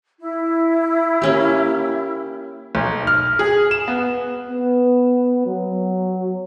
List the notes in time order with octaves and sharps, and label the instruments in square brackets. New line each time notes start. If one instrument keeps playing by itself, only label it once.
[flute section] E4
[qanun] A#3 C#4 G4
[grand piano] B1
F6
G#4
E7
B3
[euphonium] B3
F#3